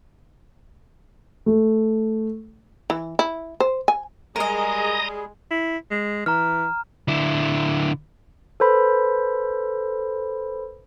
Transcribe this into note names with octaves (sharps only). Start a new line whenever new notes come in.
A3
E3
E4
C5
G#5
G3 G#3 G#4 A#4 D#5 A#5 D#6
E4
G#3
E3 A#5 F6
D3 E4
A4 B4 C5 B5